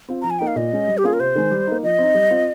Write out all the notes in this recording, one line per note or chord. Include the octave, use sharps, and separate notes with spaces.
C4 F4
F3 A#5
G#5
A#3 D#4 G5
F5
A#2 D#5
G#3 C#4
G3
G4
A#3 C#4 F4 G#4
A#4
C3 C5
D#3 G#3
G3
A#3 D#4
F3 D#5
C4 D#4
G3
C4 F4